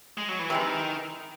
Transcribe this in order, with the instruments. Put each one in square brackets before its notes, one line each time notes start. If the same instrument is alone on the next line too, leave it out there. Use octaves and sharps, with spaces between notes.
[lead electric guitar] G#3
F#3
E3
[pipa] C3 E3 G#3 [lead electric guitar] D#3